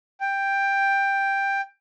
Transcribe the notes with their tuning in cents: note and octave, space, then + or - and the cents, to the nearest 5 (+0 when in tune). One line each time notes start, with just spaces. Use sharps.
G5 +10